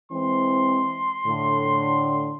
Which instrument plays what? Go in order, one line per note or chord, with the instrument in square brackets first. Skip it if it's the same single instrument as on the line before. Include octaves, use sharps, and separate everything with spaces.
[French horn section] E3 G#3 C4 [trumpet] C6
[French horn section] A2 D3